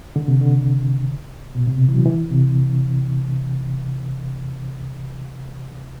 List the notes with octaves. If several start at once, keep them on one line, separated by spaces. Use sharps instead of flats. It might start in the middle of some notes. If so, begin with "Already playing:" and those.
D3
C3
D3
B2
C3
E3
F#3
E3
C3